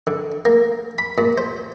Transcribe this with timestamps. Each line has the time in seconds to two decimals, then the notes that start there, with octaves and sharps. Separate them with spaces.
0.07 D3
0.45 A#3
0.98 B5
1.18 A#2
1.38 C5